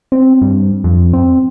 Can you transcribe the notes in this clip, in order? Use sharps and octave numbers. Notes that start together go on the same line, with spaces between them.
C4
G2
F2
C4